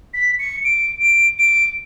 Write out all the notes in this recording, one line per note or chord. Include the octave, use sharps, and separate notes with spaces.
B6
C#7
D7
D7
D7